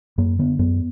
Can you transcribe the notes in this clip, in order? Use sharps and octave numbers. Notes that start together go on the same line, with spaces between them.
F#2 A#3
D3 B3
F#2 B3